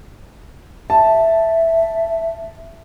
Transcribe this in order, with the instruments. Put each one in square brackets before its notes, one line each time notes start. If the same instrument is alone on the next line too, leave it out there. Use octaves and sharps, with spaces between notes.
[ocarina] E5 [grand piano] A5